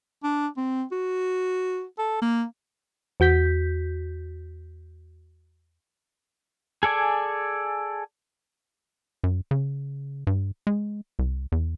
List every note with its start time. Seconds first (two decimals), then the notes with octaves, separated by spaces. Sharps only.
0.23 D4
0.57 C4
0.92 F#4
1.99 A4
2.22 A#3
3.20 E2 F#4 G6 B6
6.83 G#4 A4 D5 G#5
9.24 F#2
9.51 C#3
10.27 G2
10.67 G#3
11.19 C2
11.52 E2